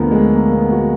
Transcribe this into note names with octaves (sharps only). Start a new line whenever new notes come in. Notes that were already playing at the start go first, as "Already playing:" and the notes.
Already playing: D2 D3 F3 A#3 B3
G#3
A#3
A#3
B3
F#4